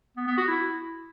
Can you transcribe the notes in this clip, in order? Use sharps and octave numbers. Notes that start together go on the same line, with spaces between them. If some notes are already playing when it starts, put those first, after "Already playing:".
B3
B3
F#4
E4